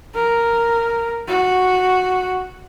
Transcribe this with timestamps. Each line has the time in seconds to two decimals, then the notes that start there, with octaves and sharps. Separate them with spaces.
0.14 A#4
1.27 F#4